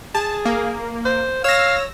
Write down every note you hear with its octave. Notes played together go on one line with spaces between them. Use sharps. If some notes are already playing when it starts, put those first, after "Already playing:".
G#4 A5
A#3
C5
C#5 F5 E6 A#6